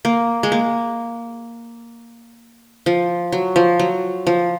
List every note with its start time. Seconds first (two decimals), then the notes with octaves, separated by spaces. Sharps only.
0.05 A#3
0.43 G#3
0.52 A#3
2.86 F3
3.32 F#3
3.56 F3
3.79 F#3
4.27 F3